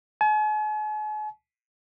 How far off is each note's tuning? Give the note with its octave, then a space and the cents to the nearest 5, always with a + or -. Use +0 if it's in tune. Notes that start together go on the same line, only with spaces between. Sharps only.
G#5 +45